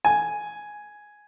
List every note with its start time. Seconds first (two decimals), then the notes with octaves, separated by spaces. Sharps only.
0.05 G#5